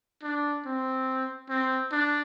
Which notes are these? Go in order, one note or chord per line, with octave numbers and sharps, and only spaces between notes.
D4
C4
C4
D4